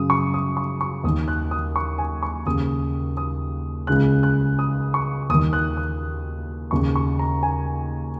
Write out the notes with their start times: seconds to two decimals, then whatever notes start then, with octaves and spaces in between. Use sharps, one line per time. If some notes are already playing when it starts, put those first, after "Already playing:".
Already playing: F#2 C#3 D#6
0.10 C#6
0.34 D#6
0.57 C#6
0.81 C#6
1.04 D#2 D#3 D#6
1.28 F#6
1.51 D#6
1.76 C#6
1.98 G#5
2.23 C#6
2.46 D#2 C#3 D#6
3.17 D#6
3.87 C#2 C#3 F#6
4.23 F#6
4.59 D#6
4.94 C#6
5.29 D#2 D#3 D#6
5.53 F#6
5.77 D#6
6.71 D#2 C#3 C#6
6.96 C#6
7.19 A#5
7.43 G#5